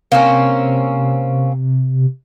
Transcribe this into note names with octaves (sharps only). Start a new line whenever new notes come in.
C3 A#3 C4 C#4